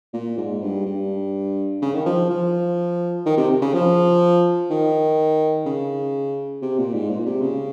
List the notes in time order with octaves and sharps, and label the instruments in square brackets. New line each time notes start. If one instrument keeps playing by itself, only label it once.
[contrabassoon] A#2
G#2
G2
G2
C#3
D#3
F3
F3
D#3
C3
C#3
F3
D#3
C#3
C3
A#2
G#2
A#2
C3
C#3